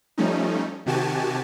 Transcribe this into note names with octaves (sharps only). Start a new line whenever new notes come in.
F3 G3 A3 C#4 D#4
C3 D#3 F#4 G4 G#5 A5